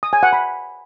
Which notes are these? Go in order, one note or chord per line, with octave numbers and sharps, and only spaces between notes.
D#6
G#5
F#5
B5